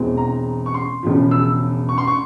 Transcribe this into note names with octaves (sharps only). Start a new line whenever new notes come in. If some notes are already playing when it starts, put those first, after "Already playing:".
Already playing: E1 E2 E3 G#3 C4
A#5
C#6
C6
E1 E2 C#3 F3
E6
C#6
C6
C#6